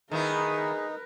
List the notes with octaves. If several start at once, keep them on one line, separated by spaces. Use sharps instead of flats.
D#3 B3 D#4 E4 G#4 A#4 B4